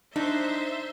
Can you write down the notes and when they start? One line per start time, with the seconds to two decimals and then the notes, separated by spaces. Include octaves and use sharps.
0.16 D4 D#4 C5 E5